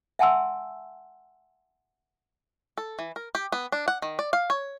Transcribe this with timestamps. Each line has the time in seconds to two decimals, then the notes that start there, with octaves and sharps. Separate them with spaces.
0.19 E5 F#5 G#5 A5 C6 E6
2.78 A4
2.99 E3
3.16 A#4
3.35 G4
3.52 B3
3.72 D4
3.88 F#5
4.02 D#3
4.19 D5
4.33 F5
4.50 C#5